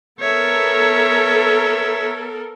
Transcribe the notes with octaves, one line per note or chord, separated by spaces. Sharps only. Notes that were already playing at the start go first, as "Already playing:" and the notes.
B3 A4 A#4 C#5 E5